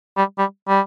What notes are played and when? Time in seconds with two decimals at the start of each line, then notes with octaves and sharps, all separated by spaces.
0.17 G3
0.38 G3
0.68 G3